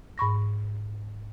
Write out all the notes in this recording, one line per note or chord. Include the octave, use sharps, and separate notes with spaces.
G#2 B5 C#6 A#6